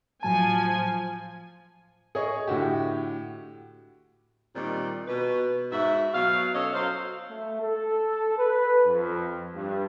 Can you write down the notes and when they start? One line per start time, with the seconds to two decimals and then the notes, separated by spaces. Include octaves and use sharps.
0.23 A2 F3 F#3 G#5 A5
2.15 G#4 C#5 D#5 C#6
2.47 A2 D3 F#4 G4
4.55 A#2 D#3 G3 C4 F4
5.07 B2 B4
5.71 G#2 F#4 E5
6.14 B2 F#3 F5
6.54 C#4 A4 C#5 D#5
6.74 F#3 C5 F5
7.29 A3
7.60 A4
8.38 B4
8.86 F2
9.55 G2